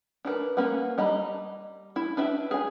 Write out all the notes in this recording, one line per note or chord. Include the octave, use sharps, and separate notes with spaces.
D4 A#4 B4
A#3 C#4 B4 F#5
G3 D#5 A#5 B5
E4
D4 B4 E5 G5
G#4 G#5